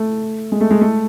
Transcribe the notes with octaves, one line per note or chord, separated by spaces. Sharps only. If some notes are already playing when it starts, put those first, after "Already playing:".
Already playing: A3
G#3
A3
G#3
A3